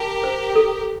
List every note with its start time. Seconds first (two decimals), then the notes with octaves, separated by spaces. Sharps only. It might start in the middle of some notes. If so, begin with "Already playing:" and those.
Already playing: G4 A#4 A5
0.24 C5
0.55 A4